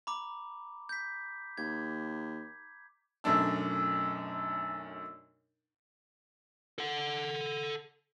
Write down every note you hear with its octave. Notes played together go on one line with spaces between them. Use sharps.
A#5 B5 D6
G6 B6
D#2 G#6
B1 F#2 A3 D4 E6
A4 F#5